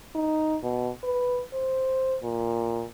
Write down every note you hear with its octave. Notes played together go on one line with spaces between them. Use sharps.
D#4
B2
B4
C5
A#2